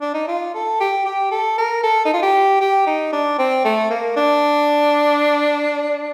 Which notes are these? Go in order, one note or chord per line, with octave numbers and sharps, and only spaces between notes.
D4
D#4
F4
A4
G4
G4
A4
A#4
A4
D#4
F4
G4
G4
D#4
D4
C4
A3
A#3
D4